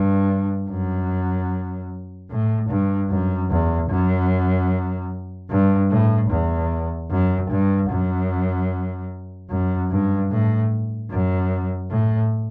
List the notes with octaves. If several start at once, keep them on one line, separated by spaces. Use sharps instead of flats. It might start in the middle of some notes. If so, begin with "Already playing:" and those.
Already playing: G2
F#2
A2
G2
F#2
E2
F#2
G2
A2
E2
F#2
G2
F#2
F#2
G2
A2
F#2
A2